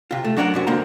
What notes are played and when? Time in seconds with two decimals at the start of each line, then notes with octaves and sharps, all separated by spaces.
0.11 C3 F4
0.24 A3
0.37 F#3 D4 F#4 A#4 C#5 F#5
0.54 F#2 C3 F#3
0.67 D3 A#3 C4 F#5 A#5